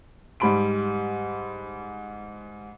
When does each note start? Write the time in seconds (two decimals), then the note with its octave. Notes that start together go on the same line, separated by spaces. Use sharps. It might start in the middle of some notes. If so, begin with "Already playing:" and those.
0.40 G#2 G3 G4 B5 C6 D7